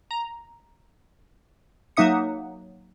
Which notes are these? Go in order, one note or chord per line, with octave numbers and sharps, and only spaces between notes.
A#5
F#3 A#3 D#4 E5 D#6 C#7